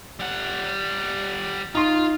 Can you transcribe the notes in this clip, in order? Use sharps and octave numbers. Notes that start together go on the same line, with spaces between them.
G3 F#5
D#4 F4 C6